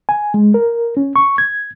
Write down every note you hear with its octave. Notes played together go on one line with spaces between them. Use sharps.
G#5
G#3
A#4
C#4
C#6
G#6